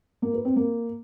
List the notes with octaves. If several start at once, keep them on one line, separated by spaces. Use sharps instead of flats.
A#3
B4
C4
A#3